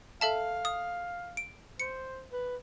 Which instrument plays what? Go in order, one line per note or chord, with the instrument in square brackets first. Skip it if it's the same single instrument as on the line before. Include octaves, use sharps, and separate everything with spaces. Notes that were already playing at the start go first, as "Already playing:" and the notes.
[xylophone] A4 E5 A5 [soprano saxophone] F5
[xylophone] D#6
D7
[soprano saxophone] C5 [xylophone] C#7
[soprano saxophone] B4